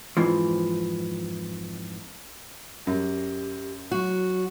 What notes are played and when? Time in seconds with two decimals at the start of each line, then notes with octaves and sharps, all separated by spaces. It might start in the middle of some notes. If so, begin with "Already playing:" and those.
0.17 F2 G#2 E3 F3
2.87 F#2 G4
3.91 F#3 F#4